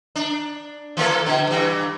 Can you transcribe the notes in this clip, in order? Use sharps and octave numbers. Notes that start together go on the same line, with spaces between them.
D4
E3 A#3 A4
B2 D3
G2 E3